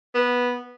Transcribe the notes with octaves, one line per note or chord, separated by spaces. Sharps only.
B3